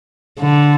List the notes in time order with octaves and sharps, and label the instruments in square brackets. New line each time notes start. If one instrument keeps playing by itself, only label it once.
[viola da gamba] D3